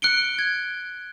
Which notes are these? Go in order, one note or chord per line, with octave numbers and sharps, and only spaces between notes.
F#6 C#7 D7 G7
G#6